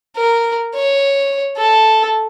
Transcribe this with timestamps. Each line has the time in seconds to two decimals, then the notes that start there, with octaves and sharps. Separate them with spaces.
0.17 A#4
0.75 C#5
1.57 A4